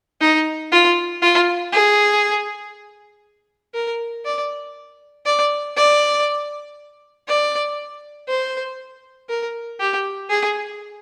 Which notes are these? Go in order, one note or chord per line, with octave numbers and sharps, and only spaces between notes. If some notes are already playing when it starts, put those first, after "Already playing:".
D#4
F4
F4
G#4
A#4
D5
D5
D5
D5
C5
A#4
G4
G#4